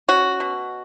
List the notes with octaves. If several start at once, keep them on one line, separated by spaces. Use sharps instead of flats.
C#4 F#4
B2